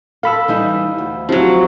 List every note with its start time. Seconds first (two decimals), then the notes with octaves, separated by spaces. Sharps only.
0.23 A4 F5 B5 E6
0.48 E3 G3 D#4
0.98 D2
1.29 C3 F3 F#3